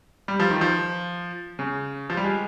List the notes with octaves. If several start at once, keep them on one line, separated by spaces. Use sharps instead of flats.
G3
F3
D#3
F3
C#3
F3
G3
G#3